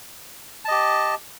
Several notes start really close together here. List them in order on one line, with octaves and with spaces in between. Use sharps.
A5 D#5 G4